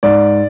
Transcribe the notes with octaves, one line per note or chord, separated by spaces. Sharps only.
G#2 D5